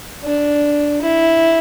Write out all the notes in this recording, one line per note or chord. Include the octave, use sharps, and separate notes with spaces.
D4
E4